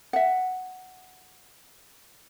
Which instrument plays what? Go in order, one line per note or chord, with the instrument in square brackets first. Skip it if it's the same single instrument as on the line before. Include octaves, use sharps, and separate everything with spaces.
[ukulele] E5 F#5